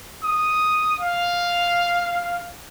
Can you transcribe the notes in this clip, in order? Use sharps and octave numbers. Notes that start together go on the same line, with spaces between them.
D#6
F5